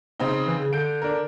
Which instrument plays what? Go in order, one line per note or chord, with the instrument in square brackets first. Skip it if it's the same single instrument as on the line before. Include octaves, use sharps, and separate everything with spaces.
[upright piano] C#3 C4 D#4
[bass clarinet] E3
C#3
[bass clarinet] D3 [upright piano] G6 D7
[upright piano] D4 A#4